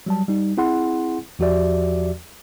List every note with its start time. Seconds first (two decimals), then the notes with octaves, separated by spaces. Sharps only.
0.06 F#3 G3 A5
0.28 G3 D#4
0.57 C4 E4 G#4 F#5 C6
1.39 E2 F3 F#4 G4 D5 E5